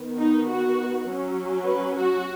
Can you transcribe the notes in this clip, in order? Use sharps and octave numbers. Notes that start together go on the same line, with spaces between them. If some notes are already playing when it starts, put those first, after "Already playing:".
Already playing: D#3 B3
D#4
F#4
F#3 C#4
B4
F#4